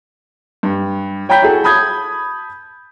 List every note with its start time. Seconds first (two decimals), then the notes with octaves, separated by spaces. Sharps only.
0.63 G2
1.29 C#5 G5 A#5 B5 G6 B6
1.42 E4 F#4 G#4 A4
1.64 A5 B5 D#6 G6 G#6